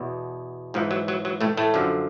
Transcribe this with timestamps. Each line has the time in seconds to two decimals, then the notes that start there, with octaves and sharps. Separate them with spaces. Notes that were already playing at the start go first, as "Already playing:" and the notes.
Already playing: E2 B2
0.74 G#2 E3 F3
0.91 F#3
1.08 F#3
1.25 F#3
1.41 A2 A3
1.57 A2 A3
1.74 F#2 D3 F3